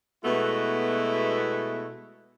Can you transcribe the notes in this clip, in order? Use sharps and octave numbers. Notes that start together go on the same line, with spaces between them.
B2 G#3 A3 B3 E4 F#4